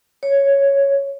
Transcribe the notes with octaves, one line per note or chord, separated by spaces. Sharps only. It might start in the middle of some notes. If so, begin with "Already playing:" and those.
C#5